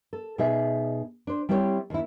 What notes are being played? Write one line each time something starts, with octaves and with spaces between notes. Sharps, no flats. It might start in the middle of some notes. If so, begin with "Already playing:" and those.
A4
B2 D#4 G#4 E5
D4 C5
G3 C4 E4 G4 C5 C#5
D#2 E4